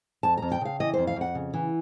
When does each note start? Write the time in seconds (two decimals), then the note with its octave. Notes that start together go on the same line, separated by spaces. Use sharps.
0.23 F2 A5
0.37 F2 A#5
0.52 G5
0.61 C#3 F5
0.80 E3 D#5
0.94 F2 C5
1.07 F5
1.16 F2 F#5
1.35 C#3
1.54 E3